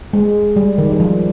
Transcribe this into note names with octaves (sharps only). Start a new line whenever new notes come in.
G#3
G3
D#3
G3
F3